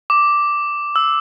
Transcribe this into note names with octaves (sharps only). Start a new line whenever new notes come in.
D6
E6